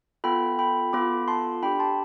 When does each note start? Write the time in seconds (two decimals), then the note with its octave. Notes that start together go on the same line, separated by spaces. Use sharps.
0.24 B3 F4 A4 G5 B5
0.59 G5 B5
0.93 B3 F4 A4 B5 D6
1.28 A5 C6
1.62 D4 G4 G5 B5
1.79 A5 C6